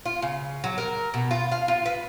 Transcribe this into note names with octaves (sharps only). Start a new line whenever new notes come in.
F4
C#3
F#3
A#4
B2
F4
F5
F4
B4